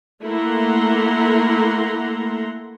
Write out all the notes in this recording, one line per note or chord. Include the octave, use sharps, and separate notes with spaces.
A3 A#3 E4 F#5 A#5 C6